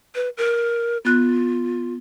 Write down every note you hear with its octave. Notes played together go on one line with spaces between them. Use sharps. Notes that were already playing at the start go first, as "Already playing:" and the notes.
B4
A#4
B3 F4 F#6